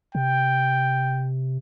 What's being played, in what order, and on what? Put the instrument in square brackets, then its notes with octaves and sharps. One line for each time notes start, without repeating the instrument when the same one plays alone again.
[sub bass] C3 [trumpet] G5